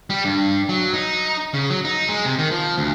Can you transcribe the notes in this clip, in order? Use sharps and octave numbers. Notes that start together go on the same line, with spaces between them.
G3
G2
F#3
D#4
C#3
F#3
D#4
G#3
C3
D#3
F3
D2